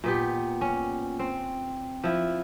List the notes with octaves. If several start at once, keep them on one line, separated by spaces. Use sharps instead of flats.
A#2 B3 G4
C#4
C4
F3 E4